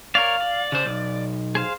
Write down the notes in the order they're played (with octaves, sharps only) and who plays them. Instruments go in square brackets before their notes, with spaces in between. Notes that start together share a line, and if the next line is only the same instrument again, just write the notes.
[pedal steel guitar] A#4 C#5 D5 [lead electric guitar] F5
[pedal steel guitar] D5
[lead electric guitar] C#3 C5
B1
[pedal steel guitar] G#4 C5 F5